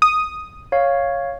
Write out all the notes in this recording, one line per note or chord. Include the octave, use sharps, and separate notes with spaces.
D#6
C#5 F5